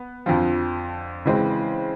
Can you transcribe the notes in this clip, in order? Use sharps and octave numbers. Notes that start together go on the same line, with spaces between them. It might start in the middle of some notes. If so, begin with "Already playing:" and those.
Already playing: B3
F2 D3 F3
C#3 E3 G#3 C4